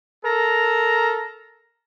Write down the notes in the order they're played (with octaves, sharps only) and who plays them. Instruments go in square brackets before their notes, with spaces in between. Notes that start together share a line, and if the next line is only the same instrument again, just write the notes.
[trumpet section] A4 A#4 A#5